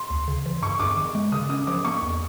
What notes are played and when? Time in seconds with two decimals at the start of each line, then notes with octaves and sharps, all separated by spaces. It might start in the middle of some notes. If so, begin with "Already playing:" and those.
Already playing: C6
0.10 D2
0.28 C#3
0.46 E3
0.62 G2 C#6
0.79 G2 D6
0.97 D#3
1.15 G#3
1.32 C#3 D#6
1.49 C#4 D#6
1.67 F3 D6
1.85 A#3 C#6
2.02 E2